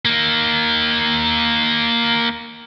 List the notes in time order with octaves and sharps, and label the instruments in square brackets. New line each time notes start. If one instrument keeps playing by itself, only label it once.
[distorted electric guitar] A#3 D#4